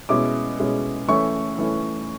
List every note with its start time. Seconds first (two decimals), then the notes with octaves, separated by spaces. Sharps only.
0.09 B2 G#3 C#4 E4 D6
0.59 B2 G#3 C#4 E4
1.08 E3 A3 C#4 E4 C#6
1.58 E3 A3 C#4 E4